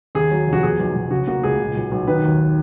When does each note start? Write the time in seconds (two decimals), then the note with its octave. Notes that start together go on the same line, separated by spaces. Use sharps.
0.15 D#2 G#4
0.31 F#3
0.47 F1
0.53 F#4
0.63 B2 G#4
0.79 B1
0.95 B1
1.11 C#3 F#4
1.28 A#3 F#4
1.43 C#2 G#4
1.59 A#2
1.75 B1
1.91 B1
2.07 D#3 B4
2.24 D#2